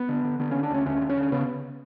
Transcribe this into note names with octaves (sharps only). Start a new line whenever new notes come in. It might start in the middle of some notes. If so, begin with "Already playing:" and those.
Already playing: B3
D3
D3
D3 B3
D3 C#4
D4
D2 C#4
D2 C#4
D3
C#4
D3
C#3 B3